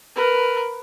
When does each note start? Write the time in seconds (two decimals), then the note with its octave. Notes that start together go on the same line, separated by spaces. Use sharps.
0.15 A#4 B4